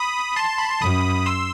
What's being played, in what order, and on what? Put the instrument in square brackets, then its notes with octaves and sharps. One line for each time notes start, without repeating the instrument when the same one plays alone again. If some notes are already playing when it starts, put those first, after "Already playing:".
Already playing: [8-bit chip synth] B5 D#6
A5 C6
B5
C6
[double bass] F#2 [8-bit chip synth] B5 D#6
[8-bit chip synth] C6 E6